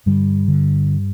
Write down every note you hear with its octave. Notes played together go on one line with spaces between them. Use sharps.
G2 D3 G3
D3